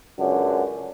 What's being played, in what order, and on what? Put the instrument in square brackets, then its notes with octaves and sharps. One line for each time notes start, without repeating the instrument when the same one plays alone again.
[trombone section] C#2 F#2 D3